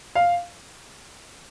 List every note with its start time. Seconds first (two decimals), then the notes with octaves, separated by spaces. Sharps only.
0.15 F5